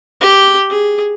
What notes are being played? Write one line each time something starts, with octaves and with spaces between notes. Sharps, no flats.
G4
G#4